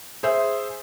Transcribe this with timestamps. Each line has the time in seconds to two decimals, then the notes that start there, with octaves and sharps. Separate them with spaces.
0.23 G#4 C5 E5